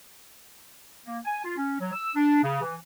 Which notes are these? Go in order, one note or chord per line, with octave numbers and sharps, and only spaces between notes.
A#3
G#5
F4
C#4
F#3
E6
D4
C#3
E3